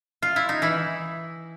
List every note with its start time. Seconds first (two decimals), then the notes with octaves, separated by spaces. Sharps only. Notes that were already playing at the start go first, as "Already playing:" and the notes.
0.22 F4
0.36 E4
0.49 D#4
0.62 E3 E4